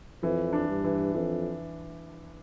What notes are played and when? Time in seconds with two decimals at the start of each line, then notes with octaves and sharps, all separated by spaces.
0.23 F2 E3
0.53 D4
0.69 G2
0.84 E3
1.14 F2 E3